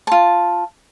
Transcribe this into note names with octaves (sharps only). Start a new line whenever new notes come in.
F4 A5